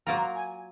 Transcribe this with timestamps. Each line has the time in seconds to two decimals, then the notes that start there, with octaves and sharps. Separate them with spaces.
0.07 F#3 A#3 F4 A#4 A#5
0.35 G#5